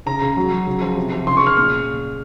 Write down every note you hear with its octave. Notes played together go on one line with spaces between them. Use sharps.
C#3 A#5
C#3
F#3
F#3
C#3
F3
C3
F3
C#3 C6
C#6
C#3 F6
A#2 F6